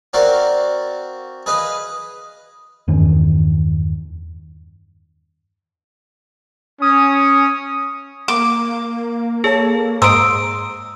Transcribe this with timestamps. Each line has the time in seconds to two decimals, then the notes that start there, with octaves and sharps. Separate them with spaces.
0.13 C4 F#4 A#4 D5 F5
1.46 G#4 B4 D#5 F5
2.88 E2 G2 D#3 C#4
6.82 C#4 D#6
8.28 A#3 D6
9.44 G#4 A4 C#5 A5
10.02 G#2 A#5 C6 D#6 E6 D7